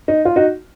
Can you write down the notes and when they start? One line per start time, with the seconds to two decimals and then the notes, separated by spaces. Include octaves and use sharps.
0.08 D#4
0.25 F4
0.36 D#4 F#4